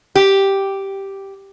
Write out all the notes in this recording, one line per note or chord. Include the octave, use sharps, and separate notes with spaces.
G4